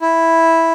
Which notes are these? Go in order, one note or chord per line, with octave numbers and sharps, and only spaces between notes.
E4